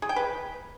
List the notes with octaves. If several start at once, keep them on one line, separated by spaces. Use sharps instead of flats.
G#4
G5
B4